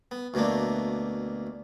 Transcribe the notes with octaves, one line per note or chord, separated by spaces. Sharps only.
B3
D2 B2 A3 A#3 D4